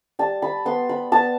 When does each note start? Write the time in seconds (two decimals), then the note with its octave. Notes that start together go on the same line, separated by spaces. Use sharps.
0.19 G3 A5
0.42 B5
0.66 B3 C6
0.89 B5
1.12 B3 A5